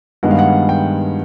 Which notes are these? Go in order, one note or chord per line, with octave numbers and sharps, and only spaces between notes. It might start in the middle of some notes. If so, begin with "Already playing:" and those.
G2 D#3 G#3 B3 F#5
F5
F#5
G5